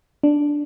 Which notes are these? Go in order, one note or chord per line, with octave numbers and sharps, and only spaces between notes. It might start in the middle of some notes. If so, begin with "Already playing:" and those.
D4